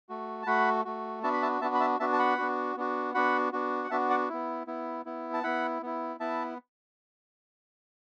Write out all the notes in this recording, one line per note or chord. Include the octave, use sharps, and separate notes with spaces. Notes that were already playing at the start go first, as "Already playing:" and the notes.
A3 F#4
A5
A3 F#4 F#5 B5
A3 F#4
B3 D4 F#4 E5 A5
B5
E5 A5
B3 D4 F#4 E5 A5
B5
E5 A5
B3 D4 F#4 E5 A5
A5
F#5 B5
B3 D4 F#4
B3 D4 F#4
B3 D4 F#4 F#5 B5
B3 D4 F#4
F#5
B3 D4 F#4 E5 A5
D5 F#5
B3 E4
B3 E4
B3 E4
A5
B3 E4 F#5 B5
B3 E4
B3 E4 E5 A5